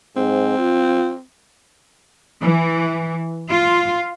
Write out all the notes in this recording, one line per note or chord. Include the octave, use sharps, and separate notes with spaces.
G#2 C4
F4
E3
F4